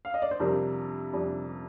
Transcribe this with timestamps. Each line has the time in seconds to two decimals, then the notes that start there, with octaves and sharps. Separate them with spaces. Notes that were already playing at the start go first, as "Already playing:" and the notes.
0.05 F5
0.14 D#5
0.22 D5
0.31 C5
0.40 F2 C3 G3 D4 A#4
1.13 F2 C3 G3 D4